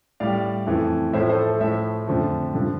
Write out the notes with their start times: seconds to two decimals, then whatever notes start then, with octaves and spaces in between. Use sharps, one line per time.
0.20 A2 G3 D5 F5
0.66 F2 E3 A3
1.13 A2 F3 A3 C5 E5
1.29 A4 C5
1.44 A4
1.60 A2 F3 A3 C5 E5
2.07 F2 D3 F3 A3
2.54 G2 D3 F3